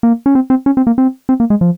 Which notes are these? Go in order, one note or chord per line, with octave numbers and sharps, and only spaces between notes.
A#3
C#4
C4
C4
C#4
C4
A#3
C4
C4
A#3
G#3
F3